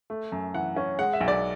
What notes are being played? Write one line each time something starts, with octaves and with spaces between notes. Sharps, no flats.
A3
F#2
E3 F#5
C#4
G#3 F#5
E5
B1
D5